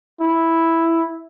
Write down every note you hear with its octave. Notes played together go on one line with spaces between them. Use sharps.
E4